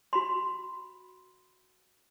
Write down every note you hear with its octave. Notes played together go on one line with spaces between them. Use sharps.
F#4 B5 C6